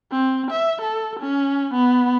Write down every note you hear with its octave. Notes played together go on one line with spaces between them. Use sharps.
C4
E5
A4
C#4
B3